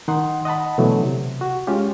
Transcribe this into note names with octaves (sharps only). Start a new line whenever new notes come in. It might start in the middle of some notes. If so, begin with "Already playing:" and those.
D#3 D#4 F#5 C6
D#5 F#5 A5 B5
B2 D3 E3 F#3 A3
C3
F#4
G#3 C#4 F4 G4